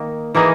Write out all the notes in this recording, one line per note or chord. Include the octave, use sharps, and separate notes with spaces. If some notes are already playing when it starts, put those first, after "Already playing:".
Already playing: D#3 A#3 D#4
E3 A#3 D#4 G#4